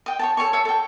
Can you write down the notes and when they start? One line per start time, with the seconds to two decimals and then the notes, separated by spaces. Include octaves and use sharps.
0.06 D#5 G5
0.19 C#5 G5 A5
0.37 A4 C#5 G#5 C#6
0.53 C#5 E5 A5
0.65 A4 G5